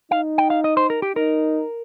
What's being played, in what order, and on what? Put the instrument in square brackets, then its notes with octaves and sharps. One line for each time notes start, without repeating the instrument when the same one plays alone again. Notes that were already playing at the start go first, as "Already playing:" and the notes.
[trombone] D#4 [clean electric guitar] F5
[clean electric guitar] G5
F5
D#5
C5
A#4
G4
[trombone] D#4 [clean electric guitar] A#4